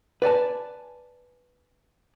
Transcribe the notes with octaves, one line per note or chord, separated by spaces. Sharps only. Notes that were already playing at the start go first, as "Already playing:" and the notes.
B4 D5 G#5 A5